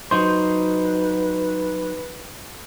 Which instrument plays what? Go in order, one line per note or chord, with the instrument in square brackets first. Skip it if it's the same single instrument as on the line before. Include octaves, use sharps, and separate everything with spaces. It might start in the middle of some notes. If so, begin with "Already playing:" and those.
[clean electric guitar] F#3 D#4 C5 [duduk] B4